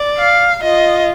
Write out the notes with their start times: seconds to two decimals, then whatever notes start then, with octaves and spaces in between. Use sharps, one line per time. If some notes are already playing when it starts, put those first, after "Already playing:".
Already playing: D5
0.19 F5
0.63 F4 D#5